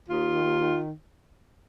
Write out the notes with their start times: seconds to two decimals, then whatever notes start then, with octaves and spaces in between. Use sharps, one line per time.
0.09 D#2 F4
0.26 D#3
0.43 D#2
0.59 D#3